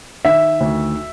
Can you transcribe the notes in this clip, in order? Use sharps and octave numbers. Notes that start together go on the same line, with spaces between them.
D#3 E5
D2